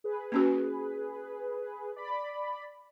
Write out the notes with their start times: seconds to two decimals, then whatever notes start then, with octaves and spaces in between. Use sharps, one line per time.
0.04 G#4 B4
0.32 A#3 C#4 F#4
1.96 D5 B5